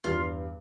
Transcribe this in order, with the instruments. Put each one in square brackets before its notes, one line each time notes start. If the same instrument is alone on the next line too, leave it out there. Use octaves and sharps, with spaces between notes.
[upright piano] E2 G2 [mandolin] F4